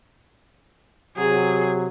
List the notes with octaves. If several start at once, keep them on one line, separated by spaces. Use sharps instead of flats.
C3 F#3 G#4